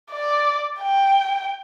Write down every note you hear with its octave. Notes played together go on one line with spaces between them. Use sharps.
D5
G5